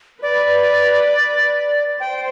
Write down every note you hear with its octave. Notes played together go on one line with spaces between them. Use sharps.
B4 D5
C5 G5